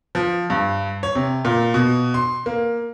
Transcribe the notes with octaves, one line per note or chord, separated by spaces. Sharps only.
F3
G2
C#5
C3
A#2
B2
C6
A#3